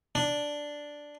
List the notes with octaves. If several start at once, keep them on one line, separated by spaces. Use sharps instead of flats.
D4